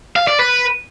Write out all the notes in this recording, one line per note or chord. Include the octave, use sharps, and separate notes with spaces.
F5
D5
B4